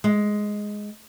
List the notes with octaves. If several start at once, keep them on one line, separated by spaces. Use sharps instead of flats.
G#3